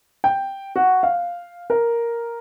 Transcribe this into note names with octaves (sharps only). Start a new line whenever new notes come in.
G5
F#4
F5
A#4